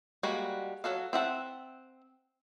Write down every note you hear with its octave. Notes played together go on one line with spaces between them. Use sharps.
G3 G#3 A#3 F#4
F#3 F#4 A4 F5
C4 E5 F#5 A5